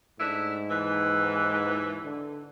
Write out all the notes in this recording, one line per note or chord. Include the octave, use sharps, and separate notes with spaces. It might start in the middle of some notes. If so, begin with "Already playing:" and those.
G#2 A3 D4 E4
D#2 E3
D3